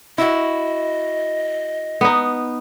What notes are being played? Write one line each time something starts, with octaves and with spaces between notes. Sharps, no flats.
E4 F#4 D#5
B3 D#4